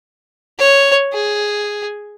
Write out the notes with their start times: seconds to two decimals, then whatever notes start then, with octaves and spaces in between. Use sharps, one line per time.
0.58 C#5
1.13 G#4